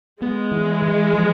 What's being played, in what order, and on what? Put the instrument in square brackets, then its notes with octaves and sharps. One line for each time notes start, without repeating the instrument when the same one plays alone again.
[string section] G#3 [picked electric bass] B3
[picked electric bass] E3
E3
F3